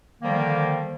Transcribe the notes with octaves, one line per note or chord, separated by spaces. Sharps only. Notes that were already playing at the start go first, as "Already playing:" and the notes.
D3 D#3 F3 G3 A#3